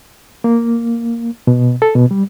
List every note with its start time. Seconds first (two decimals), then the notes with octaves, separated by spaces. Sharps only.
0.44 A#3
1.47 B2
1.82 A4
1.95 B2
2.11 G3